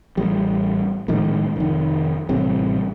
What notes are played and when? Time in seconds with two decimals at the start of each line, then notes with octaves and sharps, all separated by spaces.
0.17 A1 G3
1.08 A#1 A2 D#3 G#3
1.56 F1 D#3
2.29 A1 A2 C3 G3